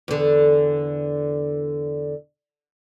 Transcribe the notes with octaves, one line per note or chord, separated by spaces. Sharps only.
E2 D3